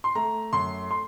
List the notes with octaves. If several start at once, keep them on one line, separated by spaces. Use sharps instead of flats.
C6
A3 A#5
F#2 C6
C6